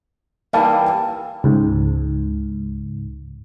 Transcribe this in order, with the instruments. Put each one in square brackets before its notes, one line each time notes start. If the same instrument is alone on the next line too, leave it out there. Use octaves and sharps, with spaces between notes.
[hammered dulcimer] E3 G3 [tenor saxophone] A#3 [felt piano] F5 A5
[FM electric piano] C#2 G#2